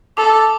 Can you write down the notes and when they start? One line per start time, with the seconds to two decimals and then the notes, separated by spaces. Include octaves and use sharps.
0.17 A4 D6